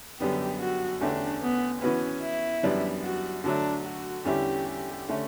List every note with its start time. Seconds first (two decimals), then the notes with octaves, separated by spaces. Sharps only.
0.20 F#2 D3 G3 B3 G4
0.60 F#4
1.01 E2 D3 A3 C#4 D4 G4
1.42 B3
1.82 E3 B3 C#4 F#4 B4
2.22 E4
2.63 F#2 E3 G3 B3 D4
3.03 F#4
3.44 D3 F#3 A3 D4
3.85 F#4
4.25 E2 D3 G3 C#4 E4 G4
4.66 G4
5.09 D3 A3 C#4